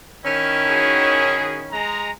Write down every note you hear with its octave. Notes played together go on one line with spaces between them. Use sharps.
D#3 C#4 E4
F#4 G#4
G#3 A#5